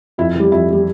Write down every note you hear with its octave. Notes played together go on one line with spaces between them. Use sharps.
F2 E4
E3 G3
F2 E4
E3 G3